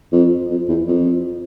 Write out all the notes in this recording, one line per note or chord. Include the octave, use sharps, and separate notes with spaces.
F2
F2
E2
F2